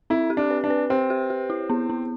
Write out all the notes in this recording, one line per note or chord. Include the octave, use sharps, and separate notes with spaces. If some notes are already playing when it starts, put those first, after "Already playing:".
C4 E4
G4
D4
B4
D4
B4
C4 G4
G4
G4
E4
B3
B3